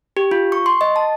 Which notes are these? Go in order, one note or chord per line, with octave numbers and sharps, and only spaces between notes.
G4
F4
C#6
C6
D#5
A5